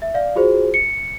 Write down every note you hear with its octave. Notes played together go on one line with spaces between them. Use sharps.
E5
D5 F5
F4 F#4 G#4 C5
C#7